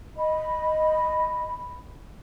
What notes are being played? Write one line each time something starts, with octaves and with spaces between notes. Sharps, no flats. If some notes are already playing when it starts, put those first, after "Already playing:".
D#5 B5